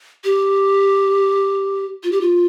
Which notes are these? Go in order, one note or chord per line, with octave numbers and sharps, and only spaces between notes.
G4
F4
G4
F4